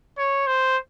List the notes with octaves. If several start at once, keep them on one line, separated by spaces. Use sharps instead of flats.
C#5
C5